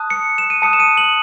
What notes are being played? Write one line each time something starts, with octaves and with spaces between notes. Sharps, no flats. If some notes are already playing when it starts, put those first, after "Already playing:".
Already playing: A5 D#6 F#6
C#7
E7
D#7
A5 D#6 F#6 C#7
E7
D#7
F#7